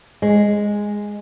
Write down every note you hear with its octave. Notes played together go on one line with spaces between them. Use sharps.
G#3